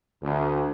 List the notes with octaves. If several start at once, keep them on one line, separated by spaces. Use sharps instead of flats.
D2